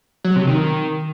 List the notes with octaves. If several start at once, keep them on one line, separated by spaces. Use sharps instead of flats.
F#3
C3
D#3